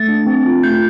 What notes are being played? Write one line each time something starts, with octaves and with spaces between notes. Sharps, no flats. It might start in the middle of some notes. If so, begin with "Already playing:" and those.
Already playing: A3 A6
D4
C4
F4
A3 G6